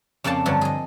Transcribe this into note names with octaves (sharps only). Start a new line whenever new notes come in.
F2 C#3 A#3 D5 A5 C6
G2 D3 F3 F#3
G#4 D#5